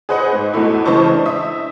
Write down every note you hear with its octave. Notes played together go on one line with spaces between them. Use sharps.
G#4 B4 C5 D#5 F#5
G#2
E2 B2 A3 E4
C#3 E3 G#3 C5 A5 C#6
D4
E5 D#6